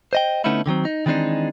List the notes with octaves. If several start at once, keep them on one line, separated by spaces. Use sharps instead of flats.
C5 D#5 G5
D3 A3 B3 C#4 D#4 E4
D3 D#3 F#3 C4
D#4
D#3 E3 G#3 C4 D4 D#4